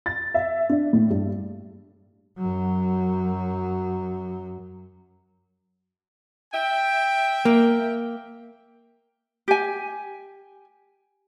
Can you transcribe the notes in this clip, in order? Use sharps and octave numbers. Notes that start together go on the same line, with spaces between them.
A6
E5
D4
A2
G2
F#2 F#3
E5 G5
A#3
G4 G#5